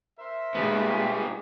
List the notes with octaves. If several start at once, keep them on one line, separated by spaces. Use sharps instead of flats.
A#4 C5 E5
A#2 G3 G#3 B3